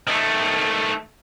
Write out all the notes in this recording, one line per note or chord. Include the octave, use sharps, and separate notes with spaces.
D#3 A3